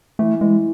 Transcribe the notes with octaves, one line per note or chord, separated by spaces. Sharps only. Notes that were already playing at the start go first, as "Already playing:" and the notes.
E3 A3
E3 G#3